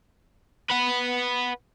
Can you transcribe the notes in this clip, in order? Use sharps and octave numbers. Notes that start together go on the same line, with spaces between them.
B4 F#5